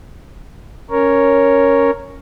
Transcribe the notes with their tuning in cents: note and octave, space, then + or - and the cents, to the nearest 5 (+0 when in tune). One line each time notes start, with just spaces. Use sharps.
C#4 +0 A#4 +0 C#5 +0